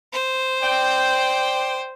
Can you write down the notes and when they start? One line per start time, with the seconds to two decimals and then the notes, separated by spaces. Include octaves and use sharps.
0.13 C5
0.63 D5 G5